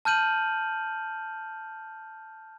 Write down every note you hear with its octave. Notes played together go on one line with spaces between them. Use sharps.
A5 F6 G6 D#7 F#7